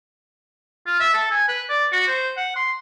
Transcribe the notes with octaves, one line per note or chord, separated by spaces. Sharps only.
F4
E5
A4
G#5
B4
D5
F#4
C5
F#5
C6